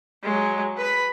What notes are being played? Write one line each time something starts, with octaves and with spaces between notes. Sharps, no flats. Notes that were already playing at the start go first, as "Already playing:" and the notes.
F#3 G#3
B4 B5